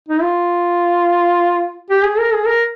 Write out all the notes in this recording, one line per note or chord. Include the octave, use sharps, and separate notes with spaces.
D#4
F4
G4
G#4
A#4
G#4
A#4